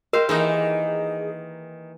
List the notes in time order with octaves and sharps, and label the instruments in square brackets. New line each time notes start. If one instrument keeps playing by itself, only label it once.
[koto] G4 C5 F5 [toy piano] A#4 [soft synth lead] D#5
[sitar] D#3 D#5 [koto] E3 A#3 D#4 [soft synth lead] G#4